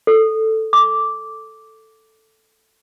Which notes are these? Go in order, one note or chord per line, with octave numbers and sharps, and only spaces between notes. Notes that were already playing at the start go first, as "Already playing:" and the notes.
A4
D6